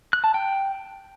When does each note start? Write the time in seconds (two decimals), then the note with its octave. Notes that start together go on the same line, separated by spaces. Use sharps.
0.13 F#6
0.24 A5
0.34 G5